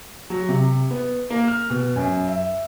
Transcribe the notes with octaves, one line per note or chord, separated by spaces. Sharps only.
F#3
C3
B3
A#3
F6
B2
F#2
E5